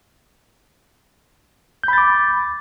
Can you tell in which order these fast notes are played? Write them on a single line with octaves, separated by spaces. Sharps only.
G6 B5 A6 D6